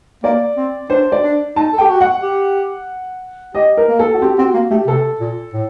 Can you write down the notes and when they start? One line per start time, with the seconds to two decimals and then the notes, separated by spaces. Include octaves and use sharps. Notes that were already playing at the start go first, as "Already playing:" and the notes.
0.24 A#3 D5
0.57 C4
0.90 D4 C5
1.12 D5
1.23 D4
1.56 D#4 A5
1.73 A4
1.78 G4 G5
1.90 F#4
2.01 F#5
2.22 G4
3.55 G4 D#5
3.77 A#4
3.88 A#3
3.99 A4
4.14 F#4
4.22 C4 G4
4.38 C4 F#4
4.54 A#3
4.71 A3 G4
4.87 C3 A4
5.20 A#2
5.54 A2